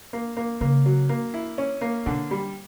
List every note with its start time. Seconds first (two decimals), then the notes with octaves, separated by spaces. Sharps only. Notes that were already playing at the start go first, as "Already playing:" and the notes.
0.13 A#3
0.37 A#3
0.61 C#3 A#3
0.86 F#3
1.09 A#3
1.34 E4
1.58 C#4
1.81 A#3
2.06 B2 D3
2.31 G3